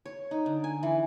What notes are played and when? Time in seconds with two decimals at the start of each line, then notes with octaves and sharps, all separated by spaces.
0.06 C#5
0.31 D#4
0.46 D3
0.64 G#5
0.83 E3